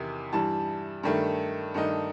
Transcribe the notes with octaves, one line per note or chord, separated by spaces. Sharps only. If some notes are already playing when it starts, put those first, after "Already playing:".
Already playing: E2 C3 D#3
G2 E3 G3 A5
G2 D#3 A3
G2 D#3 A3 D#4